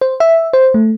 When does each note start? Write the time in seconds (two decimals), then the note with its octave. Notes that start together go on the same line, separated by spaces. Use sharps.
0.01 C5
0.20 E5
0.53 C5
0.74 A3